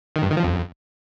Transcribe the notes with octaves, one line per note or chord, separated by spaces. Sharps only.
D#3
G2
D#3
F3
F2